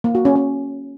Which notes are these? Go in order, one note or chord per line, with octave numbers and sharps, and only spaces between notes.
A#3
F#4
C#4
C#4